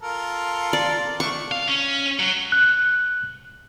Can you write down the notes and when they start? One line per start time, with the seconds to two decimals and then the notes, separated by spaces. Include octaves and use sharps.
0.02 F4 A4 A#4
0.73 D5
1.20 A3 D4 C#6
1.51 F5
1.68 C#4
2.19 F#3
2.52 F#6